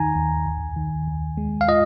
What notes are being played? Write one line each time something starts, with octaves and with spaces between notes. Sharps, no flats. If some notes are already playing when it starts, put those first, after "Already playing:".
Already playing: D#2 D#3 D#4 G#5 A#5
D#2
D#2
D#3
D#2
G#3
F5
F4 D#5